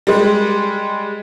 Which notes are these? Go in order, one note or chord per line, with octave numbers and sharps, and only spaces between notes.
G3 G#3